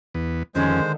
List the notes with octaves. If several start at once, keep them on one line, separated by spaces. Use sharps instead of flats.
E2 B3
F2 D3 D#3 G#3 C#4 C5